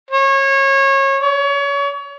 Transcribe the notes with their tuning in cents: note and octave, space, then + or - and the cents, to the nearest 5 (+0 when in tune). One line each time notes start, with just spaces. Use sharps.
C#5 -25
C#5 +30